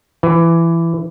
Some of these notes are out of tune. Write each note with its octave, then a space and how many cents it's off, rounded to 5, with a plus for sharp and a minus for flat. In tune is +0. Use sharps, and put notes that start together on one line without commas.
E3 +15